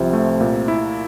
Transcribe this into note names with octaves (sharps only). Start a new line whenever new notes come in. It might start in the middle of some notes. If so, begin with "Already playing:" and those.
Already playing: C2 C3 F3
A3
A#2
E4